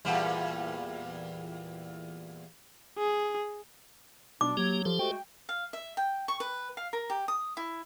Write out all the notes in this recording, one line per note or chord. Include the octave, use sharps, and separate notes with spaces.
E2 A#2 G3
G#4
B2 D4 D6
F#3 A#3 G4 G#6
F3 G4 A4 C5
G#3 A3 F#4 G5
F5
E5
G5
C#6
B4
F5
A#4
G4
D#6
E4